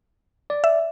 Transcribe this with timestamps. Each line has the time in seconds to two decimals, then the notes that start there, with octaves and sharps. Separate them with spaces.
0.50 D5
0.64 E5